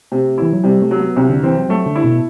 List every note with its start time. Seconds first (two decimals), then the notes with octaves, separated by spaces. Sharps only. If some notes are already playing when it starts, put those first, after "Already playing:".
0.12 C3 A3
0.38 E3 E4
0.53 F#3
0.64 C3 G3
0.82 A3
0.91 F#3
0.99 B3
1.16 C2 C4
1.30 D3
1.43 E3 C4
1.57 F#3
1.69 F#3 A3
1.86 D3
1.96 E4
2.04 B2